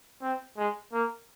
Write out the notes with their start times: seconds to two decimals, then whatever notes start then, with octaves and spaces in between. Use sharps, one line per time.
0.22 C4
0.57 G#3
0.93 A#3